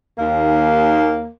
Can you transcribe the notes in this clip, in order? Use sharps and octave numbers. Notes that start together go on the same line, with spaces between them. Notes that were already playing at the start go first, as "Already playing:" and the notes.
D#2 A#3